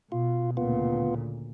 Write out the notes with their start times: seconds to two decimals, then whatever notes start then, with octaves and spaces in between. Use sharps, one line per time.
0.12 B2 F4
0.57 D2 A#2 C#3 B3 F4